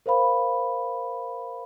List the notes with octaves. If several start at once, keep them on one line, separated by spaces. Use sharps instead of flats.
A#4 C5 F5 B5